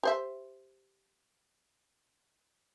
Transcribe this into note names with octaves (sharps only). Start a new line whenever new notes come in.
G4 C5 E5